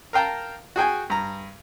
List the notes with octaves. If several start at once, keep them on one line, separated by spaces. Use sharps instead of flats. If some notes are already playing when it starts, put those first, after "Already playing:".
A#4 F5 G5 A5 A#5
F#4 G#4 G5 G#5
G2 A#5